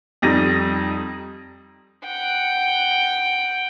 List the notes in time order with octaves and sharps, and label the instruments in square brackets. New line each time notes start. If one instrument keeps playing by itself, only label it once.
[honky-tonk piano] F2 G3 D#4 A#6 D#7
[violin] F#5 G5